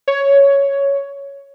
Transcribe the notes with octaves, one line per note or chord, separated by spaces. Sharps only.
C#5